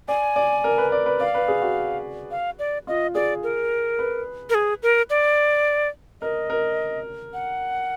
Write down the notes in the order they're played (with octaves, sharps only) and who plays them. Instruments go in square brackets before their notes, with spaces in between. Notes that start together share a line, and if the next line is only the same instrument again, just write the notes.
[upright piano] D5 [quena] G#5
[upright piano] D5
A#4
B4
D5
B4
[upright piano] D5 [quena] F5
[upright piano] B4
G#4
F#4
[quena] F5
D5
[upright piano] F4 [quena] D#5
[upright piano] G#4 [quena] D5
[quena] A#4
[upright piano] B4
[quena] A#4
G#4
A#4
D5
[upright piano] A#4 [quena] D#5
[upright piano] A#4
[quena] F#5